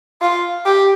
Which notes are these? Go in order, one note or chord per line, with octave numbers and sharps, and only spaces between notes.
F4
G4